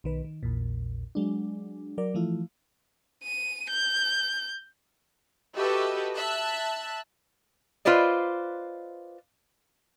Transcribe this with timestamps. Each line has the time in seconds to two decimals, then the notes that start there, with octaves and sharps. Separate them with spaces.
0.04 B1 D#3 B4
0.25 D#3
0.43 A#1 E2 A#2
1.15 F#3 G#3 D4
1.98 F#3 A#4 D5
2.14 E3 F3 A3 E4 F4
3.23 D#7
3.70 G6
5.57 F#4 G4 A4 B4 D#5 E5
6.15 E5 A5 F#6
7.85 F4 B4 C5 D5 D#5